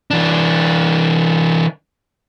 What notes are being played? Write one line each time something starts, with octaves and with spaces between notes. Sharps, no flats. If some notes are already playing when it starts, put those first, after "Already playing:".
E3 D4